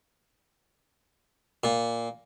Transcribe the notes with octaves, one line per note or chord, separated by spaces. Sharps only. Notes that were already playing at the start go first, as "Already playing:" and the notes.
A#2